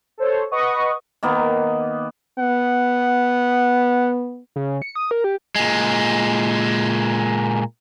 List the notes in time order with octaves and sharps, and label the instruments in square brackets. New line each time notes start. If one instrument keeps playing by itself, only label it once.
[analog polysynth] A4 C5 C#5
B4 D#5 F#5 C#6 D#6
[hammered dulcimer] D#3 A#3 B3
[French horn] B3 [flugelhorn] F#5
[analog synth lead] C#3
C#7
D#6
A#4
G4
[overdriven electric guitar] A#2 G#3